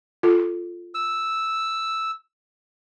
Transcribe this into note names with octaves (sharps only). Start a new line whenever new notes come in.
F4 A4
E6